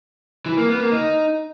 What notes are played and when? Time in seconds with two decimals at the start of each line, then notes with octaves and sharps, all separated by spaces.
0.46 E3
0.57 A#3
0.69 B3
0.80 A#3
0.92 D#4